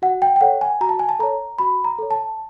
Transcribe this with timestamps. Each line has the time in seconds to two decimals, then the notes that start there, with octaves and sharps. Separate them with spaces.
0.02 F#4 F#5
0.22 G5
0.36 G5
0.41 A4 C#5 F#5
0.61 G#5
0.81 F#4 A#5
0.89 A5
0.99 G#5
1.09 A5
1.19 A4 C#5 A#5
1.58 F#4 B5
1.84 A#5
1.98 A4 C#5
2.11 A5